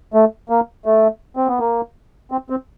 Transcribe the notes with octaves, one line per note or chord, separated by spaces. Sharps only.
A3
A#3
A3
C4
B3
A#3
C4
C4